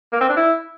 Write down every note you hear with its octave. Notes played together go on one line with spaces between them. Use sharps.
A#3
C4
D4
E4